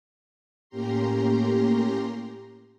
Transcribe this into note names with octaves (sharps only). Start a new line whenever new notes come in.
A2 A#3 C#4 G4 A#5 C6